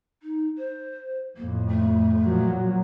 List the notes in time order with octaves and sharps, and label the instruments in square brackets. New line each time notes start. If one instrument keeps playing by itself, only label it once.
[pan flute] D#4
C5
[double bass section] F2 A2 [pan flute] A#3
[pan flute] A3
[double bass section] A#2 F3 F#3